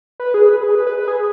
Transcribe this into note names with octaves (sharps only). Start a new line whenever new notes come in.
B4
G#4
B4
G#4
B4
B4
B4
G#4